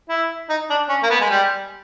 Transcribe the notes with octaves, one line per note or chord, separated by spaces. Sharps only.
E4
D#4
D4
C#4
A#3
B3
G#3
G3